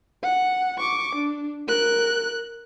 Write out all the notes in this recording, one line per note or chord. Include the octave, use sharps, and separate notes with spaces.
F#5
C#6 D6
D4
A#4 F#6